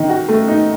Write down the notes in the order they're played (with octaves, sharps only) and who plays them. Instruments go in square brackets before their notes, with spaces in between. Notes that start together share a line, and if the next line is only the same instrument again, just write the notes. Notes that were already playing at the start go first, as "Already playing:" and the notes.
Already playing: [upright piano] D#3 D#4
F#4
A3
D#4